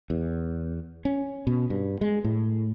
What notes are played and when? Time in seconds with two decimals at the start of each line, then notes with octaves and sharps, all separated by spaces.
0.10 E2
1.05 C#4
1.47 B2
1.70 G2
2.01 G#3
2.24 A2